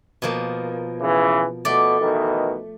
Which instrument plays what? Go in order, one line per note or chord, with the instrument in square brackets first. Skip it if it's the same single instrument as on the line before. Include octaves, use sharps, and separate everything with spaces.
[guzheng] B2 F3 A#3
[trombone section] C#3 E3
[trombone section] B2 [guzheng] A3 D5
[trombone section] B2 D#3 E3